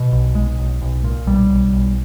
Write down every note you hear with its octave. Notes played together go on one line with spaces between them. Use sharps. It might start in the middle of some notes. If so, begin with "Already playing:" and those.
Already playing: B2
B1
B1 G#3
B1
B1
A#2
B1 G3
B1
B1